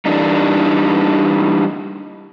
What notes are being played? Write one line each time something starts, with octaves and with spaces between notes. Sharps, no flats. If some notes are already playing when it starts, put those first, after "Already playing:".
E3 G3 D4 D#4